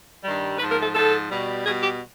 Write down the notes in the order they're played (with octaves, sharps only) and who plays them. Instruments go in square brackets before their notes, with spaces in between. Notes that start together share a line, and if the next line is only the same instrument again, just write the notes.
[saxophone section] G2 D#3 G3
G#2 F3 B4
A#4
A4
G#2 F3 A4
B2 G3
B2 G3 G#4
G4